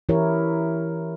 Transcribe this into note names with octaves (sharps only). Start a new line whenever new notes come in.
E3 E4 G4 A#4 C#5